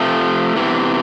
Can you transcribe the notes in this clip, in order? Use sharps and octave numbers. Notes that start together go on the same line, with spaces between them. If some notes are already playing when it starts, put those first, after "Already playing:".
Already playing: C3 F3 A3
E2 C3 E3